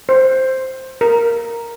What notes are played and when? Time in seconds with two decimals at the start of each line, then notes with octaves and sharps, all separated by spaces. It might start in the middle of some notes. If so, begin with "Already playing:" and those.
0.09 C5
1.01 A#4